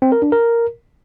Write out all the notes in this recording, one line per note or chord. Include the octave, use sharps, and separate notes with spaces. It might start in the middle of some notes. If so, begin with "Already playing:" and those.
C4
A#4
D4
A#4